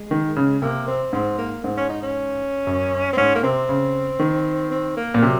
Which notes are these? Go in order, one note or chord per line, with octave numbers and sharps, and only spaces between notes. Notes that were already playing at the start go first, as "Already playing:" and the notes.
Already playing: G#3
D#3
C#3
C3 A#3
C4
G#2 C4
A#3
G#2 C4
C#4
D#4
C#4
F#2
C4
G#2 C#4
A#3
C3 C4
C#3
D#3
C4
A#3
A#2
C3 F#3